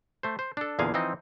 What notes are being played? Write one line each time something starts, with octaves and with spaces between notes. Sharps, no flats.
A3 C5
C5
D4 A4
E2 A#2 D3 G#4 F5 G#5
E3 F3 C4 D#4 D#5